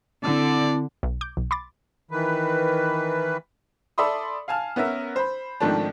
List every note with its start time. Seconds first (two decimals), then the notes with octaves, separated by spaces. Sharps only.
0.24 D3 C4 E4 D5 A5
1.03 B1
1.21 D6 G6
1.37 B1
1.51 B5 C6 D6 A6
2.11 D#3 E3 B4
3.98 A4 D5 E5 B5 C6 D#6
4.48 F5 G#5 A5 F6
4.76 B3 C#4 A#4 E5
5.16 C5 B5
5.60 G#2 D#3 F3 A3 C4 D4